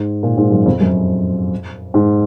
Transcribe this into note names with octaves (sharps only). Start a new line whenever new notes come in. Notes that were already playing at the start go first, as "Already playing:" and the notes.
Already playing: G#2
A#2
G#2
F#2
F2
F#2
G#2